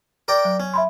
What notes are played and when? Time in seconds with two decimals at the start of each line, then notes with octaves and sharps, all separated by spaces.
0.28 A#4 D5 G5
0.45 F#3
0.60 C#4
0.74 E5 B5 C6